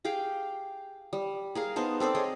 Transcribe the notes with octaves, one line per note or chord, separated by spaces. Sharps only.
G4 G#4 F5 G5
G3
G#4 A#4 F5
B3 D#4 C5 A5
C4 A4 C5 D5
G#4 C#5 D#5